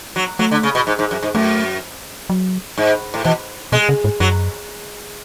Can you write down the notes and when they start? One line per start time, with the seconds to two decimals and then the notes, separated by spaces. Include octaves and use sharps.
0.16 F#3
0.39 F#3 A3
0.51 D3
0.63 C#3
0.75 B2
0.87 G#2
0.99 G#2
1.11 F#2
1.23 G#2
1.35 F#2 A3
2.30 F#3
2.78 G#2
3.14 A2
3.25 B2 E3
3.72 B2 G#3
3.89 C#3
4.04 G#2
4.20 F#2 F#3